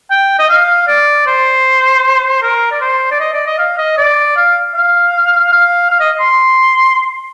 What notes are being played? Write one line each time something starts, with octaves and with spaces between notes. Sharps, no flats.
G5
D#5
F5
D5
C5
A#4
D5
C5
D5
D#5
D5
D#5
F5
D#5
D5
F5
F5
F5
F5
D#5
C6